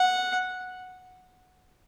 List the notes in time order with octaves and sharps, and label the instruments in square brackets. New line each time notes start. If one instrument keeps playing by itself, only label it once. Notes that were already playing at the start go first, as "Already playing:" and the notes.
Already playing: [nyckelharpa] F#5